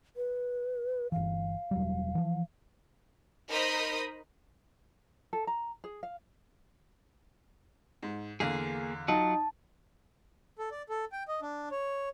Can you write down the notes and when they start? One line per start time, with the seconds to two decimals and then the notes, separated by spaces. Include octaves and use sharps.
0.16 B4
1.12 G1 E3 F5
1.71 E1 F#3 G3
2.15 E3 F3
3.49 D#4 A#4 C5 D#5 B5 D#6
5.33 A4
5.47 A#5
5.84 G#4
6.03 F5
8.03 G#2
8.40 E2 D3 A#3 G#4 F5
9.08 F#3 D#4 F4 F#4 A5
10.59 A4
10.71 D5
10.89 A4
11.12 G5
11.28 D#5
11.42 D4
11.71 C#5